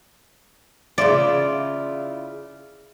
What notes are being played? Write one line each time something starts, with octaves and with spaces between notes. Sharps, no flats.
C#3 E4 F4 D5